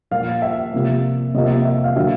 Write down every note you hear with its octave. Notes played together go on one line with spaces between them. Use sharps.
A#2 F3 A#3 F5
E5
C3 F3 A#3
C3 F3 A#3 D#5
E5
E5
F5
D3 F#3 A#3 E5